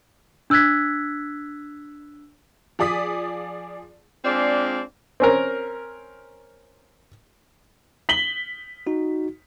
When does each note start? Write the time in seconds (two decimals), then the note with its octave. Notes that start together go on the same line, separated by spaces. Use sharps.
0.50 D4 E6 F#6 G#6 B6
2.79 F3 G#4 D5 D#6 B6
4.25 G#3 C4 D4 F4 G#4 D5
5.20 C4 C#4 A#4
8.09 B6 F#7 G7
8.87 D#4 F#4